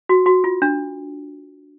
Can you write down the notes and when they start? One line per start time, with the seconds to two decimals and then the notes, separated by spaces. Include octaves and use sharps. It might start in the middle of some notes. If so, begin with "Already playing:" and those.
0.09 F#4
0.26 F#4
0.44 F4
0.62 D4